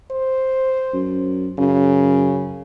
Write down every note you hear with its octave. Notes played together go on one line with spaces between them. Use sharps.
C5
F#2
F#2 C#3